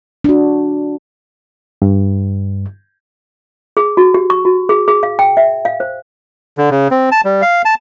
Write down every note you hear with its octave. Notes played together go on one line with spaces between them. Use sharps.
D4 F#4
G2
G#4
F#4
G4
C#6
F#4
G#4
G#4
F5
G5
E5
F5
C5
D3
C#3
C4
A5
G3
F5
A5